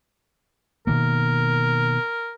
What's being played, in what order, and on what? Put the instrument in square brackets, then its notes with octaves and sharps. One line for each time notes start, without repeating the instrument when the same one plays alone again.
[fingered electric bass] B2 D#3 A#3 [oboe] A#4